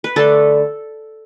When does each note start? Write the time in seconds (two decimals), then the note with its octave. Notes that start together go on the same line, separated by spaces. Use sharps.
0.04 B4
0.16 D3 A3 D4 A4